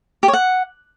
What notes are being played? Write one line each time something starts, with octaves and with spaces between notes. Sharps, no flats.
G4
C#5
F#5